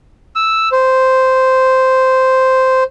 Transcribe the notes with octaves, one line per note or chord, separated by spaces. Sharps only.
E6
C5